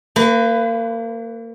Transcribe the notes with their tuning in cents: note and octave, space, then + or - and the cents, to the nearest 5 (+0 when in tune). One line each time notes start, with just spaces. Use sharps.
A#3 -30 B4 +25